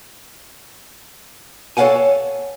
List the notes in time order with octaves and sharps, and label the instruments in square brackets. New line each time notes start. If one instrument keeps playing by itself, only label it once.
[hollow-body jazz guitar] A4 C#5 D#5 F5 F#5 G#5